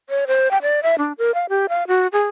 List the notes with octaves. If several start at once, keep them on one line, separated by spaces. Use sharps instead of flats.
C#5
C5
G5
D5
E5
D4
A#4
F5
G4
F5
F#4
G#4